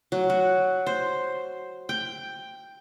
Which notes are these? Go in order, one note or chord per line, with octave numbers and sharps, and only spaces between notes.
F#3
F#4
C5
G5